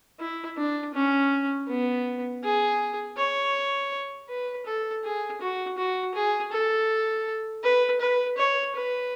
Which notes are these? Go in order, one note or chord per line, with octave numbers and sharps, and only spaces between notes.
E4
D4
C#4
B3
G#4
C#5
B4
A4
G#4
F#4
F#4
G#4
A4
B4
B4
C#5
B4